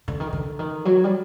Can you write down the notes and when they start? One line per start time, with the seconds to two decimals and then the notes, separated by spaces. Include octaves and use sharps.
0.08 D3
0.20 D#3
0.33 D3
0.59 D#3
0.85 F#3
1.04 G3